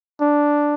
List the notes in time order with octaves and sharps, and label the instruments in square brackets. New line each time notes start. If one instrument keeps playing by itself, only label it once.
[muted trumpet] D4